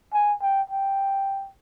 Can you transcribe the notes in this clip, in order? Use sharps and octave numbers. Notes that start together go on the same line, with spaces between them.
G#5
G5
G5